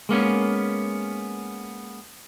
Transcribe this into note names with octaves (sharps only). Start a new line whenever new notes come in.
G#3 A#3 B3 C#4